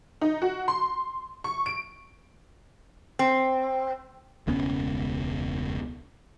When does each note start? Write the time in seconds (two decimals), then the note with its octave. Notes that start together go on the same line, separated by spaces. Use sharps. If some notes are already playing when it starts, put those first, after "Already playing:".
0.21 D#4
0.42 F#4
0.68 C6
1.44 C#6
1.66 D7
3.19 C4
4.47 E1 C#2 B3 C#4